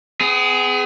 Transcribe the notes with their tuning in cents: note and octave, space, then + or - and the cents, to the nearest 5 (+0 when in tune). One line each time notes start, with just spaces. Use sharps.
B3 +45 G#4 +0